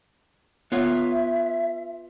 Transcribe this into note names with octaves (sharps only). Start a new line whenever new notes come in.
B3 F4 C#5 E5